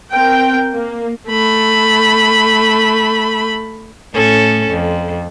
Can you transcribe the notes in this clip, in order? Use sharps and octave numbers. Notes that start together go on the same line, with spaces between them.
C4 A#4 G5
A#3
A3 B5
A2 C#4 A4
F2